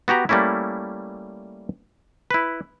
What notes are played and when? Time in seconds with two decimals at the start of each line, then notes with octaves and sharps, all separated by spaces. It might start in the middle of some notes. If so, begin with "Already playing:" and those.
0.08 B3 F#4 G4 A#5
0.29 G3 A3 A#3 C#4 E4
2.31 E4 B4